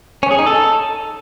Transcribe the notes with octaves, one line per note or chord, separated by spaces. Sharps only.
C#4
G#4
D#4
A4